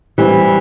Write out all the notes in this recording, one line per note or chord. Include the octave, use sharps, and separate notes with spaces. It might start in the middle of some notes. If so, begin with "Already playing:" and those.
E3 G3 C4